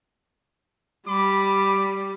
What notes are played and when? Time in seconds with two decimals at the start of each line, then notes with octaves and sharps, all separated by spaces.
1.07 G3 B5 D6